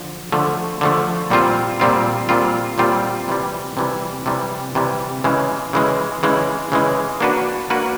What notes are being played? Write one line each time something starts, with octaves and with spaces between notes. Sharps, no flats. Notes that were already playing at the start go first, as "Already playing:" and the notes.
Already playing: D3 F3
D3 F3 A3
D3 F3 A3
A#2 G3 C4 F4
A#2 G3 C4 F4
A#2 G3 C4 F4
A#2 G3 C4 F4
C3 E3 G3
C3 E3 G3
C3 E3 G3
C3 E3 G3
C#3 E3 G#3
C#3 E3 G#3
C#3 E3 G#3
C#3 E3 G#3
A#3 D4 F#4 B4
A#3 D4 F#4 B4